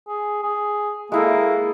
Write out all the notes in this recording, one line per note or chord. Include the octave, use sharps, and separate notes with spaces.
G#4
G#4
G#3 A#3 E4 A4